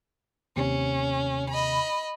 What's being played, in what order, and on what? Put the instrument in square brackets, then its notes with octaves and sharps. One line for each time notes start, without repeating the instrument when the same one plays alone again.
[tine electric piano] D#2 C3 [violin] C#4
[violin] D#5 B5